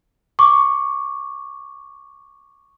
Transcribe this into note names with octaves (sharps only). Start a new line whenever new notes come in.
C#6 D6